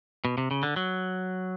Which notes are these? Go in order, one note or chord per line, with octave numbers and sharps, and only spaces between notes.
B2
C3
C#3
D3
F#3